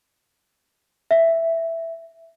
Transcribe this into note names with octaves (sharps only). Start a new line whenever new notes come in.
E5